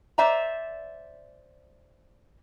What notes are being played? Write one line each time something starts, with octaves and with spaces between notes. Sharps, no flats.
C5 D5 E5 G#5 A#5